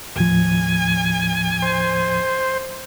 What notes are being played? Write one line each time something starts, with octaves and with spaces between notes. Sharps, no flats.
D#2 A2 F3 G#5
C5